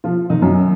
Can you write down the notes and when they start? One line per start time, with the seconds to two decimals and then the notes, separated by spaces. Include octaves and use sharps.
0.04 F3 F4
0.30 D#3 D#4
0.42 F#2 F#3